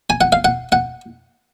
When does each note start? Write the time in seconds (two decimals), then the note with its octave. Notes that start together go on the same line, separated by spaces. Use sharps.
0.10 G#5
0.21 F#5
0.32 F5
0.45 F#5
0.72 F#5